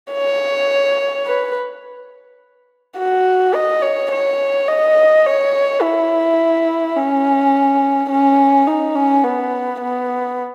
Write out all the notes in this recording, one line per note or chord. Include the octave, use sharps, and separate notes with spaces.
C#5
B4
F#4
D#5
C#5
C#5
D#5
C#5
E4
C#4
C#4
D#4
C#4
B3
B3